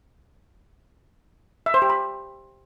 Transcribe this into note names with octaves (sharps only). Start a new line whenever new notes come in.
E5
C5
G4
B5